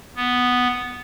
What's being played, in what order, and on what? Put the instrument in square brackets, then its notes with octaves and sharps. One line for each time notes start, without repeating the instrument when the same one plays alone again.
[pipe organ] B3